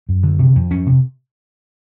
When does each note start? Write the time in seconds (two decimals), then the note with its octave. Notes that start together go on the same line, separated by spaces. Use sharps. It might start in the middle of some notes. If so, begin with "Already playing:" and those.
0.09 F#2
0.23 D3
0.39 C3
0.55 F2
0.71 F2 C#4
0.86 C3